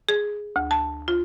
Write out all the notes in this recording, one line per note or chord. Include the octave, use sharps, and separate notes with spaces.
G#4
D2
A5
F4